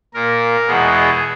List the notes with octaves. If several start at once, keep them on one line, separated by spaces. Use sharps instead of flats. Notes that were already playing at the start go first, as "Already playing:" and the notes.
A#2 A#3 A#4
E2 B2 G#3 B3 G#4